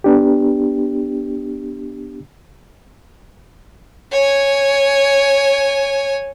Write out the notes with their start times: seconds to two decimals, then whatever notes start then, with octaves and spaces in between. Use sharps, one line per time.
0.04 B3 D4 G4
4.12 C#5 G#5